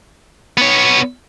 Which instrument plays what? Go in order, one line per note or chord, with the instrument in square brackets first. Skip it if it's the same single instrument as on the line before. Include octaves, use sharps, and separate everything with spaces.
[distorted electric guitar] B3 C#5